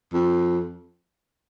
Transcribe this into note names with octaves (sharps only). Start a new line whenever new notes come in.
F2